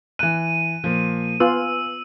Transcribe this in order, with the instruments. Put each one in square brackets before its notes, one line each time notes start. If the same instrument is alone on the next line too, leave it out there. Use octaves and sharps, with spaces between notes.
[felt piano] E3 F#6 [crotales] D#7
[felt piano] A#2 F3
[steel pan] B3 F4 B4 [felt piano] G#5 [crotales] E6